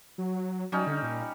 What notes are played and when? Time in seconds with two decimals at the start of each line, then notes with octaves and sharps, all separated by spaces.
0.18 F#3
0.72 F#3 G3 C#4 D#4
0.87 D3
1.03 A#2